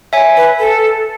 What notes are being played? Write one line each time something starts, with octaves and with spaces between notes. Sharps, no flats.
C#5 E5 G#5
B4
A4